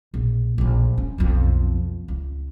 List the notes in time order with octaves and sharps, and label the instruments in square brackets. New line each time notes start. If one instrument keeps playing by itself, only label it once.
[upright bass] A#1
A#1 D3
C#4
B1 F2
C#2